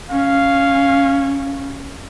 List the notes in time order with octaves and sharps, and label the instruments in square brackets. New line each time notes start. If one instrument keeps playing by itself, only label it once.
[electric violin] C#4 [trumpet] F5